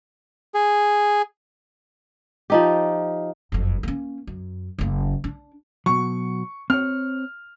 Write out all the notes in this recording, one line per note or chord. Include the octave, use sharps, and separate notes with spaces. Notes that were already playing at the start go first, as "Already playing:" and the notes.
G#4
F3 D#4 G4
F#1 F2
A#3 C#4
F#2
F#1 A#3
D4
B2 F#3 C#6
C4 C#5 F6